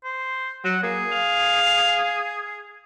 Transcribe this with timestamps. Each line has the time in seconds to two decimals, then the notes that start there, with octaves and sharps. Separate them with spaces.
0.05 C5
0.65 F#3 F#5
0.83 A#3 G#4
1.12 F5